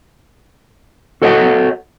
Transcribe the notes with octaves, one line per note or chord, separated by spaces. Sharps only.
F#4 A4 C#5 D#5 E5 F#5